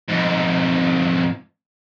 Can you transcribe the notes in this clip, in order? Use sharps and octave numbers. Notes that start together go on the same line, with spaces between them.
F2 G#2